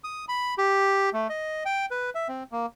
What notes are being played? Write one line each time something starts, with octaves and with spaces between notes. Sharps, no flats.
D#6
B5
G4
A3
D#5
G5
B4
E5
C4
A#3